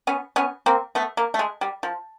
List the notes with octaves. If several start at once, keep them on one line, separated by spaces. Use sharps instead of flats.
B3 C#4
B3 C#4
A#3 C4
A3 B3
A#3
A3
G#3
G3
F3